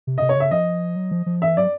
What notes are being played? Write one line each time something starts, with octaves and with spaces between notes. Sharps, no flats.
C3
C3 D#5
C#5
C#3 E5
F3 D#5
F#3
F3
F3
E3 E5
F#3 D5